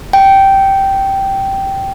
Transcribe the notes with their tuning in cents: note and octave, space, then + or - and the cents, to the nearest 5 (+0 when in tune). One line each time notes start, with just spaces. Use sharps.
G5 -10